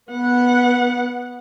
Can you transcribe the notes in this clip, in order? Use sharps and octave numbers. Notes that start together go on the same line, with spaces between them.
B3 F#5